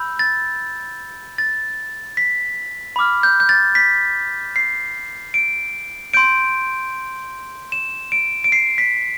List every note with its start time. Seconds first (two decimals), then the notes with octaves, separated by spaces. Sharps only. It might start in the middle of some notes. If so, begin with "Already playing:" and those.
Already playing: B5 E6 G6
0.19 A6
1.38 A6
2.17 B6
2.96 B5 D6 F6
3.23 G6
3.40 G6
3.49 A6
3.75 B6
4.56 C7
5.34 D7
6.14 C6 G6 D7
7.72 E7
8.12 D7
8.44 D7
8.52 C7
8.78 B6